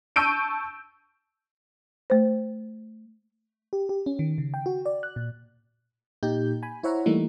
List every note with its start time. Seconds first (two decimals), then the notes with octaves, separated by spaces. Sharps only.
0.16 A5 C#6 E6 G6 D7 D#7
2.10 A3 C5
3.73 G4
3.89 G4
4.06 C#4
4.19 D#3
4.38 C#3
4.54 G5
4.66 F#4
4.86 D5
5.03 F#6
5.16 A#2
6.23 A#2 D#4 G4 G6
6.63 G#5 B5
6.83 E4 C5 C#5 E5 F#5 A#5
7.06 E3 G3 A3 A#3 D#4 E4